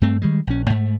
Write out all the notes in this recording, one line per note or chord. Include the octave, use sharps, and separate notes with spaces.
G2 A3 C4
D#3 G3 G#3
A#1 C#4
G#2 A3